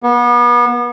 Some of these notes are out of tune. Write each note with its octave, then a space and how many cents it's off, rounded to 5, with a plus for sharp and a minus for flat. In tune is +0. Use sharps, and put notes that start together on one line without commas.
B3 -35